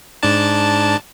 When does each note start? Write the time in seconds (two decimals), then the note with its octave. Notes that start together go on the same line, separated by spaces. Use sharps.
0.23 G#2 D4 A5